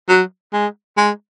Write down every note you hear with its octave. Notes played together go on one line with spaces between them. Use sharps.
F#3
G#3
G#3